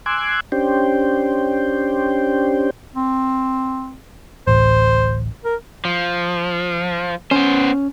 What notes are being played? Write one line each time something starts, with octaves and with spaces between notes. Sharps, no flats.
G#5 C6 D6 E6 F#6 G#6
C#4 D4 G4 C5 G5
C4
D1 A1 C5
A#4
F3
B3 C#4 C5